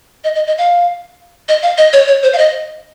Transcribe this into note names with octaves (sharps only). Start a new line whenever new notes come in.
D#5
D#5
D#5
F5
D#5
F5
D#5
C#5
C#5
C5
F5
D#5